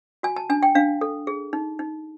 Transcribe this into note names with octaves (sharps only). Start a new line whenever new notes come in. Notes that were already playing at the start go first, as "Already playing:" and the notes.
F#4 G#5
A5
D4 G#5
G5
D4 F5
A4
G#4
D#4
D#4